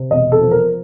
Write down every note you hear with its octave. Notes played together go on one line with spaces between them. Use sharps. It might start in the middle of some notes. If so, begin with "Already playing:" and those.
Already playing: C3
E1 D#5
A4
F3
A#4